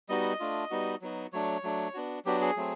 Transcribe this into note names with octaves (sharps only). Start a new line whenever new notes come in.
G3 B3 D#4 F#4 D#5
A3 D4 F4
G3 B3 D#4 F#4
F#3 B3 D#4 F#4
F#3 A3 D4 C#5
F#3 A3 D4
B3 D4 F#4
F#3 B3 D4 F#4 G4
G#4
F#3 A3 C4